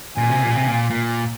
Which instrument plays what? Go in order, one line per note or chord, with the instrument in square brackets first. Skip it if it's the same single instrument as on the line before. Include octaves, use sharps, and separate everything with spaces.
[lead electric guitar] A#2 [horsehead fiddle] G#5
[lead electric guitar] C3
A#2
C3
A#2
A#2